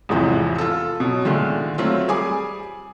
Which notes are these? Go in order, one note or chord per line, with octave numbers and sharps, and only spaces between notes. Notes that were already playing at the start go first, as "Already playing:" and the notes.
A1 E2 G#2 C3 E3 F3
F4 A4
B2 F#3
A#2 D3 D#3 G#3 A3
F#3 A3 C4 F4
G3 G#4 G#5 D6